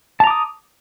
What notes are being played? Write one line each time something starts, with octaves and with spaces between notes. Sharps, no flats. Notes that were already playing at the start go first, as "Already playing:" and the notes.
A5 A#5 D6 D#6